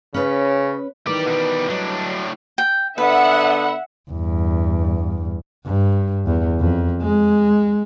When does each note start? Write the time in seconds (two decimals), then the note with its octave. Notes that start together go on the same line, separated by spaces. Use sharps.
0.14 C#3 C#4 B4
1.07 D#3 E3 B3 G4 D5
1.26 B2 G3
1.70 A2 F#3 G3 D4 D#5
2.58 G5
2.98 D3 B3 B4 E5 F#5
4.11 E2 G2
5.66 G2
6.25 E2
6.60 F2
7.01 G#3